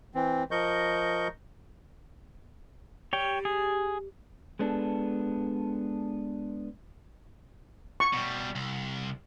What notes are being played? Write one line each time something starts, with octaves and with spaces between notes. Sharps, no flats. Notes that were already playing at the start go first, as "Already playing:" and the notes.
E3 C4
F3 A#4 D#5 C#6 G6
G3 C#5 G5
G#4
G#3 B3 D4 A4
C#6
B2 G3
C2